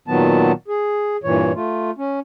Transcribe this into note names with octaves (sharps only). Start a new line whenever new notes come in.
A#2 D#3 F#3 B3 A5
G#4
G2 A#2 E3 C#5
A3 F4
C#4